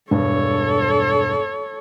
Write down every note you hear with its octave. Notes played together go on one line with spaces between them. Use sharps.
E1 G2 A4 C#5